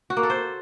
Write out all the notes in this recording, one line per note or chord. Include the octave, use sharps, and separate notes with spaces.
F#4
A#3
A4
C5